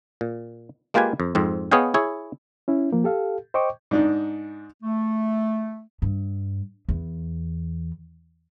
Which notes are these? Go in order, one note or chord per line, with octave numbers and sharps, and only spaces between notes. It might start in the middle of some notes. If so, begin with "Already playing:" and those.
A#2
G#3 A#3 F4 G4 B4 G#5
F2
F2 G#2 C4
B3 G#4 C#5 D#5 F5 G5
E4 G#4 C#5
C#4 E4
F3 A#3
G4 A4 F5
C5 D#5 G5 C#6 D6
G#2 D4 D#4
A3
G2
E2